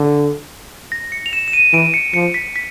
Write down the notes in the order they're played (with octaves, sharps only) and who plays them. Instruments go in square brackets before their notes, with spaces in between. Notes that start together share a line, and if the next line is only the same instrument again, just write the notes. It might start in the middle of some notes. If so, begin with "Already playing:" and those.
Already playing: [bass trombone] D3
[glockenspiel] A#6
C#7
F7
E7
E7
D#7
[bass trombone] E3 [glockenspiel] D7
[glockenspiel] C#7
[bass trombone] F3 [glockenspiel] C#7
[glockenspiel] B6
B6